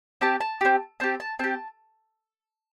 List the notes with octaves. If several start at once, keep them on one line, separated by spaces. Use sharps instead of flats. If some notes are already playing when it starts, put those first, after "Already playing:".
C4 G4 A5
A5
C4 G4
C4 G4 A5
A5
C4 G4 A5